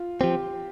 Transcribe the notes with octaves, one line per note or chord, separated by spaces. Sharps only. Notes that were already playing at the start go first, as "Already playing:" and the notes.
Already playing: F4
F3 C4 G4